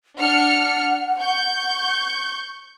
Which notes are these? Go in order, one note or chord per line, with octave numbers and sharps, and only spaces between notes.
D4 F#5 F6 C#7
C#6 G6